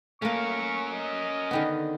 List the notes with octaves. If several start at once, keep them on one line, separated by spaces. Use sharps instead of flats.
A3 A#3 C#4 A#4 C#6
D#5
D3 D#3 B3